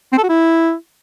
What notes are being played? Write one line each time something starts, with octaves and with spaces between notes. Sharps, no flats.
C4
A4
F#4
E4